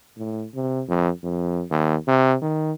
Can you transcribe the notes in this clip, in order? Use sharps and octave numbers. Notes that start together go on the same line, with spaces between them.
A2
C3
F2
F2
D#2
C3
D#3